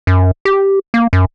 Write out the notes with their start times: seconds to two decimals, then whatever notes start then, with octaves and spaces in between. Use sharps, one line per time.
0.07 F#2
0.45 G4
0.94 A#3
1.13 F#2